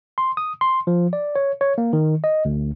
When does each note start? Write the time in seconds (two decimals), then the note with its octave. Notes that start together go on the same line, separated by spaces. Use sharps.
0.18 C6
0.37 D#6
0.61 C6
0.87 F3
1.13 D5
1.36 C#5
1.61 C#5
1.78 A#3
1.93 D#3
2.24 D#5
2.45 D2